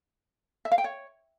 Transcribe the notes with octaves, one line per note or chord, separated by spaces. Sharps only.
E5
F5
G5
C#5